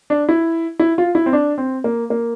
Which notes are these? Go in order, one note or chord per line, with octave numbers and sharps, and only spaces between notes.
D4
E4
E4
F4
E4
C4
D4
C4
A#3
A#3